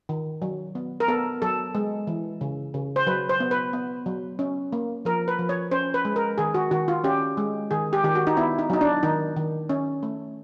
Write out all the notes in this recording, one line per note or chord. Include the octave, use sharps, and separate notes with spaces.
D#3
F#3
B3
A#4
B3 A4
F#3 A4
G#3
E3
C#3
C#3
C5
F#3 B4
C5
B3
B4
B3
F#3
C#4
A#3
F3 A#4
B4
F3
C#5
C#4 C5
B4
G#3
A#4
D#3 G#4
F#4
D#3 F#4
F4
C#4 G4
G#3
D#3 G#4
G4
D#3 G4
F#4
D#4
B3 E4
D#4
F#3 D#4
D4
D#3 D#4
D#3
C#4
A3